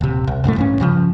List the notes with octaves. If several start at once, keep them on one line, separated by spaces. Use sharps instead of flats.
D#1 C3
C2
C2 F#2 A2 A3
A1 G2 C#4
G2 C#3 F3